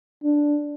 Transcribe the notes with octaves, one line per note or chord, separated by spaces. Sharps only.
D4